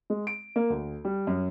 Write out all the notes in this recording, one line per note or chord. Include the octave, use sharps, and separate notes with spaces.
G#3
D7
A#3
D2
G3
F#2